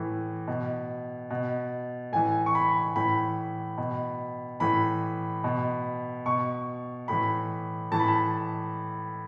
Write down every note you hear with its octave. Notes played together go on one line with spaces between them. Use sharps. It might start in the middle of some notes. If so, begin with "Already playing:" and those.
Already playing: A2 E3
B2
B2
A2 E3 G#5
C#6
B5
A2 E3 B5
B2
A2 E3 B5
B2
B2 C#6
A2 E3 B5
A2 E3 A5
B5
A5